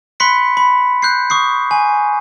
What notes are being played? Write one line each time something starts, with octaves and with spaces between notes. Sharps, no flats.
B5 C6 F#6 B6 C#7
B5
F#6 G6 C7
C#6 D#6 C7
G#5